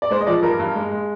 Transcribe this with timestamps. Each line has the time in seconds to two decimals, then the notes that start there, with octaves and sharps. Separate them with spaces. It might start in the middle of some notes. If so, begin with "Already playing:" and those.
0.02 D5
0.10 G#3 C5
0.20 D#5
0.27 F3 D5
0.42 G2 A#4
0.59 G2
0.75 G#3
0.91 G#3